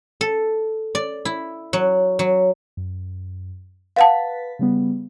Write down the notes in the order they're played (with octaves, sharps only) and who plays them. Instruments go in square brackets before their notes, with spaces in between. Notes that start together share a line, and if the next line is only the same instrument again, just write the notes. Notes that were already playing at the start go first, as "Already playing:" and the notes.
[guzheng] A4
D5
E4
F#3
F#3
[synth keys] F#2
[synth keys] B4 A6 B6 [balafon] F5 F#5 A5
[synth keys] C#3 G3 B3